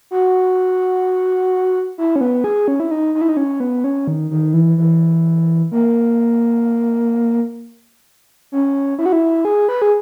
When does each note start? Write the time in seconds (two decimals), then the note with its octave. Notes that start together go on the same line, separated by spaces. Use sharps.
0.11 F#4
1.98 E4
2.16 C#4
2.21 B3
2.44 G#4
2.68 C#4
2.80 E4
2.91 D#4
3.15 D#4
3.21 E4
3.29 D#4
3.37 C#4
3.60 B3
3.84 C#4
4.08 D#3
4.31 D#3
4.54 E3
4.78 E3
5.72 A#3
8.52 C#4
8.99 E4
9.06 F#4
9.13 E4
9.45 G#4
9.69 B4
9.82 G#4